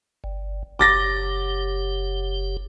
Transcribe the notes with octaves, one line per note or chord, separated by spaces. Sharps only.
G1
F#1 G4 D6 A6 A#6